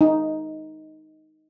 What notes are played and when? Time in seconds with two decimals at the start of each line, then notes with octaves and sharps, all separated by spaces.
0.01 D#4